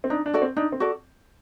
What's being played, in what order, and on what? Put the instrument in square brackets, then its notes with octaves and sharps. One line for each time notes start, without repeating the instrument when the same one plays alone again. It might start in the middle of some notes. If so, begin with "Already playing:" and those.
[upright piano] C4
[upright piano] D4 [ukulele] D#4
[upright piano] D4
[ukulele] F#4 A4 D5
[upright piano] C4
[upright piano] D4 [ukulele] D#4
[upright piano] C4
[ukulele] F#4 A4 D5